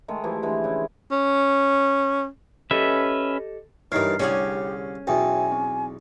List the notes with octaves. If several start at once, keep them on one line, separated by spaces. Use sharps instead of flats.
D#3 G#3 A3
E3 F3 E4 G4
D3 E3 G#3
C#3 E4
C#4
C#4 G4 A4 B4 D#5 E5
G2 E3 D#4 A#4 C#5 F6 C7
C2 D3 C#4 G4 G#4
B1 E2 F#4 E5 G5 G#5
C4